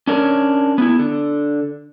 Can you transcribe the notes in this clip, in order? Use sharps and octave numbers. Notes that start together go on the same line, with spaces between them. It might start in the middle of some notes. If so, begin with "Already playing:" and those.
C#4 D4 A#4 C#5
B3 D#4 E4
D3